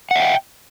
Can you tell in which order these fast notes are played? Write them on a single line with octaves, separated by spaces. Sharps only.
F#5 E5 G5